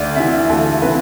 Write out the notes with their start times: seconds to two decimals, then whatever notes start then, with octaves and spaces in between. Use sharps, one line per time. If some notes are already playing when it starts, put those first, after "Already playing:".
Already playing: D2 D5
0.16 C3 E3 E5
0.49 D2 A4
0.81 C3 E3 B4